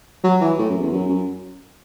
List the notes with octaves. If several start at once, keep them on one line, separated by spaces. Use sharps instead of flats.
F#3
E3
A2
F#2
E2
F#2
F#2